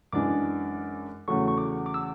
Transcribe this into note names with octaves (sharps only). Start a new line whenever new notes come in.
F#2 E3 G#3 D4 G#4 D6
E2 C#3 F#3 A3 C#6
C#6
D6
D6
E6